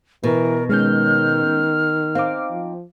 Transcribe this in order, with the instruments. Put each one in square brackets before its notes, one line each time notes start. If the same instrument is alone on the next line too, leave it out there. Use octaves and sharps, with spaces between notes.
[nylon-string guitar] B2 [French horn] E3 [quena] A#4
[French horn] D#3 [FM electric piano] G#3 C#4 G6 [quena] F6
[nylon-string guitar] C4 D#4 [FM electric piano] F5 D6
[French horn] F3